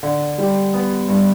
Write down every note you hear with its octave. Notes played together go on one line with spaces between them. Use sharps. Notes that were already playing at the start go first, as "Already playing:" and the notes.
D3
G3
B3
G2